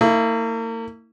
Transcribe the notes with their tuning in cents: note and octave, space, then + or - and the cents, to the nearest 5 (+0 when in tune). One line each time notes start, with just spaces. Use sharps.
A#3 -40 E4 -20